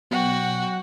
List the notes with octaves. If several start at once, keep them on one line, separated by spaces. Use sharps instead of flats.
B2 F#3 F#4 F#5 G5